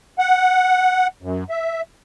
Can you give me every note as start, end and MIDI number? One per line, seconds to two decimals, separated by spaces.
0.19 1.07 78
1.23 1.44 42
1.50 1.82 76